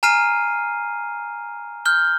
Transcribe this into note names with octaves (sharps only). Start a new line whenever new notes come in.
G#5 A#5 F6 C7 D#7
F6 G6 G7